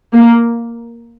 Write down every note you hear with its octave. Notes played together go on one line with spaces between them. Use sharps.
A#3